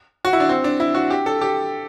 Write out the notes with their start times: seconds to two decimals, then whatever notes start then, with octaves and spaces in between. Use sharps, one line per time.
0.25 F#4
0.33 E4
0.40 D4
0.49 C4
0.64 D4
0.80 E4
0.94 F#4
1.10 G4
1.26 A4
1.41 G4